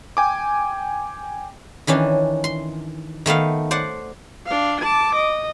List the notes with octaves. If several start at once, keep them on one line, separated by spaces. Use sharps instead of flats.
G5 G#5 D6
D#3 E3 C#4 D4
C6
D#3 A3 B3 F5
C5 D5 F#5
D4 F5
A5 D6
D#5